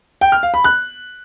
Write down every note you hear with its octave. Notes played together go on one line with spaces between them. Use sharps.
G5
F6
F5
B5
F#6